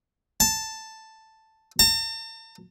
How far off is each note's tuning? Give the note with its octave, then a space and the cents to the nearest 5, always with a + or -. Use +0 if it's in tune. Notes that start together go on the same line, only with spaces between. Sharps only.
A5 +5
A5 +45